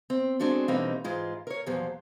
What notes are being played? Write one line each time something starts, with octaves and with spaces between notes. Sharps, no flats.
C4
G#3 C4 D4 F#4 A4
B2 E3 G3 A#3 C4 D#4
G#2 E3 G#3 F4
A#4 C#5
E2 A#2 F3 F#3 C5